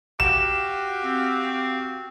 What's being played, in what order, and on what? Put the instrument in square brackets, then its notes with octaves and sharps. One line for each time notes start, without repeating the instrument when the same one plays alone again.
[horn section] F#4 G4 F5 [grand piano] E7
[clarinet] C4